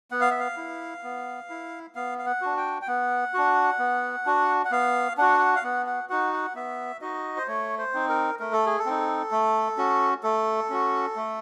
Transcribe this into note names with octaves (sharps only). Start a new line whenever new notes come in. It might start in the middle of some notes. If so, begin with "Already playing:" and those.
B3 F#5
F5
E5
F5
E4
B3
E4
B3 F5
F5
F#5
D4 F#4
G5
G5
B3 F#5
D4 F#4
B3
D4 F#4
F#5
B3 F5
D4 F#4 F#5
F5
B3 F#5
F#5
D#4 F#4 F#5
F#5
B3 E5
D#4 F#4 D#5
C5
A3 C#5
C5
C4 D#4
A#4
A3 A#4
A4
G#4
A4
C4 D#4
A3
C#4 F#4
A3 A4
C#4 F#4
A3